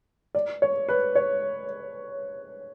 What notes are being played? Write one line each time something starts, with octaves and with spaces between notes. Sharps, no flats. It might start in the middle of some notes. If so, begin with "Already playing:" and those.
D5
C#5
B4
C#5